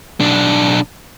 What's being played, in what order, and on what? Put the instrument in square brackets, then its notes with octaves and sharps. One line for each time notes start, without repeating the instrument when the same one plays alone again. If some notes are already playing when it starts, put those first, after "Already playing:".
[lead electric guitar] B1 D4